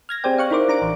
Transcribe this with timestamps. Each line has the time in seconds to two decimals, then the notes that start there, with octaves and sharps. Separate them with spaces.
0.09 F6 G#6 A#6
0.24 C4 G4 G#4 C5 D5 G5
0.38 F5 C#6 F#6
0.51 D#4 E4 A#4 C5 D5 D6
0.69 D4 A#5 D6 D7
0.82 A1 E3